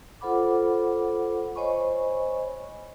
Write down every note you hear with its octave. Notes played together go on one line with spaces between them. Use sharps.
F4 A4 C5 F#5 B5 D6
C5 C#5 D#5 G#5 B5 C#6